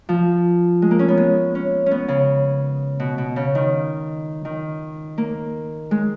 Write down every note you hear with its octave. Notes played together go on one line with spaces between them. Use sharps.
F3
G#3
A#3
C#4
B3
G#3
C#4
C#4
B3
C#3
B2
B2
C#3
D#3
D#3
A#3
G#3